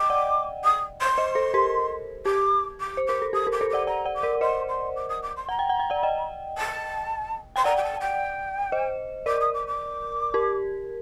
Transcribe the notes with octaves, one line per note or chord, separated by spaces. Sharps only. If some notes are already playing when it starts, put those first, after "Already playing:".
Already playing: D#5 G5 D6
D5 F#5
D#6
C6
C5 D#5
A4 C5
G4 A#4
G4 D6
D6
C5
A#4 D6
A4
G4 D#6
G4 A#4
D6
A4 C5
D5 F#5 D6
D5 F#5 A#5
D5 F#5
D6
A#4 D5
C5 D#5 C6
C6
D6
D#6
D6
C6
F#5 A#5
G5
F#5
G5
D5 F#5
D#5 G5
A5
G5 C6
D5 F#5 A#5
G5
A5
G5
C5 D#5
A#4 D5 D6
D#6
D6
D6
G4 A#4